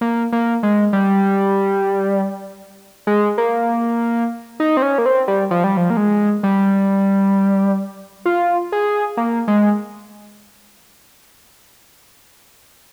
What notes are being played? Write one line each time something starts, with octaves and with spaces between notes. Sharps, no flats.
A#3
A#3
G#3
G3
G#3
A#3
D#4
C4
C#4
A#3
C4
G3
F3
G3
F3
A#3
G#3
G3
F4
G#4
A#3
G#3